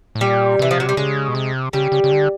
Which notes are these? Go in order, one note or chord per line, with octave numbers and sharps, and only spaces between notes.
A2
A#2 G3
C3 E3
F3
F#3
G3
C#3 G#3
B2
C3
C#3 G3
C#3
C#3
D3